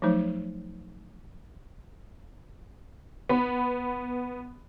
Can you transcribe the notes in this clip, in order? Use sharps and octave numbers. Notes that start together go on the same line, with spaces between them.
F3 F#3 A3 D#4 C5
B3 B5